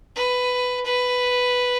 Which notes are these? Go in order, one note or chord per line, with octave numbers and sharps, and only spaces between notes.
B4
B4